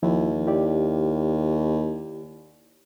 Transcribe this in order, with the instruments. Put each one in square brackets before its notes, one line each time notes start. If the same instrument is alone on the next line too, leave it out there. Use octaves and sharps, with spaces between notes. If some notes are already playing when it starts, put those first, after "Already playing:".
[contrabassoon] D#2 [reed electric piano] F3 E4
[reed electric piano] E4 G4 D5